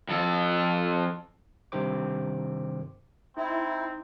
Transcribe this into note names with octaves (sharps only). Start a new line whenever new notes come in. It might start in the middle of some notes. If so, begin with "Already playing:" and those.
F2 A4
G2 C3 D#3 G4 C5 D6
C4 D#4 E4